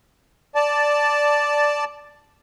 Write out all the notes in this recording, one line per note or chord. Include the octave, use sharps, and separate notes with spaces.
D5 A5